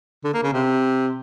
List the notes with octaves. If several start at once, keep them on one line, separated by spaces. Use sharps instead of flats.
D3
A#3
C#3
C3